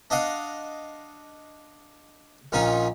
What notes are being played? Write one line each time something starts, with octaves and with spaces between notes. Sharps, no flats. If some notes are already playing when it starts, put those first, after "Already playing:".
D4 D#5 F5 F#5
A#1 A#2 C#4 D#4 F4